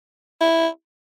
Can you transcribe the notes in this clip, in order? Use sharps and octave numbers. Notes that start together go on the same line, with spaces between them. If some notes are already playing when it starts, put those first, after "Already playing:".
E4